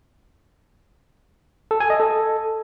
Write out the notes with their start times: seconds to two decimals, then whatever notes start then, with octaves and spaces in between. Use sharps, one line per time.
1.71 A4
1.80 G#5
1.90 D#5
2.00 A4